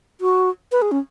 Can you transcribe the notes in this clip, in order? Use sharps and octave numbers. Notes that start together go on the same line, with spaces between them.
F#4
B4
G#4
C#4